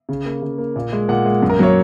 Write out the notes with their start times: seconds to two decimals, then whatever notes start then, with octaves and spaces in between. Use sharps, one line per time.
0.09 C#3
0.25 A#3
0.42 C#3
0.58 A#3
0.76 A#2
0.93 G#3
1.09 A#2 F#5
1.26 G#3
1.42 F#2
1.50 A#4
1.59 F#3 A#3 C#5